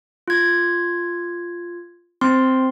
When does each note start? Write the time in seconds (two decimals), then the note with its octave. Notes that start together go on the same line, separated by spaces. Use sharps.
0.28 F4 G#6
2.21 C4 C6